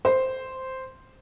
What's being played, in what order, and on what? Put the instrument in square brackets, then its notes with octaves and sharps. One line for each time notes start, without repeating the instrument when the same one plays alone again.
[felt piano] C5